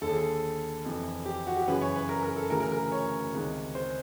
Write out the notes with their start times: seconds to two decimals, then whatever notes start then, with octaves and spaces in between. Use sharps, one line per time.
0.01 D#2 D3 A4
0.09 G#4
0.17 A4
0.85 F2 C3 E3
1.26 G4
1.47 F#4
1.57 G4
1.67 F#2 C#3 E3 B4
1.82 C#5
1.96 B4
2.09 A#4
2.23 A#4
2.36 A4
2.50 D2 C#3 E3 A#4
2.60 A#4
2.72 A#4
2.92 C#5
3.33 C#2 C3 D#3
3.75 C5